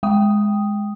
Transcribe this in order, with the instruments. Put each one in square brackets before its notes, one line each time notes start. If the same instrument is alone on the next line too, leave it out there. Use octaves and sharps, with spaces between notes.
[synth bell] G#3 G5 D#6